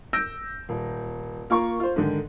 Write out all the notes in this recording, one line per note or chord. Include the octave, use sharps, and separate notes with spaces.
E6 G6 A#6 D7
D#1
A#3 F4 A#4 C#6
F4 C5
G#2 D3 D#3